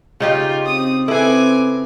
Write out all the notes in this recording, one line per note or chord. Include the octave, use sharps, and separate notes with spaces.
C#3 D#4 F4 G4
C4 D#6
C4 E4 G#4 A4 B4 G#5 D6